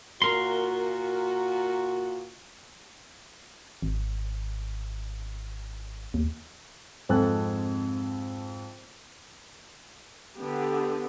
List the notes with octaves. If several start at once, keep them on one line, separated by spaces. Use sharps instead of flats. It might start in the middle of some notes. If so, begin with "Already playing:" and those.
A#2 F#4 A#4 C6
G#1
D#2
F2 G#2 C4 A4 G#5 F#6
D3 B3 G4